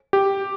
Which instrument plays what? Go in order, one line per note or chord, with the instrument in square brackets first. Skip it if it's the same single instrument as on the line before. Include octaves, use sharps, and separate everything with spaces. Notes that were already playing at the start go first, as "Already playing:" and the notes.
[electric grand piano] G4